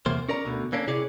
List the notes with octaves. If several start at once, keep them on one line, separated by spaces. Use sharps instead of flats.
E2 C3 A#3 C5
C#4 A#4 D5 A#5
D2 B2 D3
D3 A#3 C#4 D4
C3 E4 G#4 C#5 D5